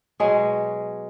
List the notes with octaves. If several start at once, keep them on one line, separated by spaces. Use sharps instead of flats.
B2 F#3 G#3 G#4